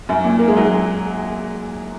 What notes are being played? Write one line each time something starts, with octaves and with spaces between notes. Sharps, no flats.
F#2
A#2
A#3
G#3
F#3
G#3